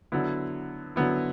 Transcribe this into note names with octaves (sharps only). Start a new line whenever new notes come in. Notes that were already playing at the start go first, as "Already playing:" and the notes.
D3 F#3 B3 E4
D3 F#3 B3 E4